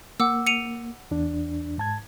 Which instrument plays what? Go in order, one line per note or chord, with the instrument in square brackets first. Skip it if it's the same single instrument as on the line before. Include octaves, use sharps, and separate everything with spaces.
[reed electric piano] A#3 [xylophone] F#5 D6 E6
[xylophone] C#7 D#7 F7
[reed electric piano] E2 D4
G#2 A5 G#6